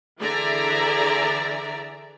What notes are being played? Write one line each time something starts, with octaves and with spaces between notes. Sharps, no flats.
D3 E3 G#4 D5 E5 A#5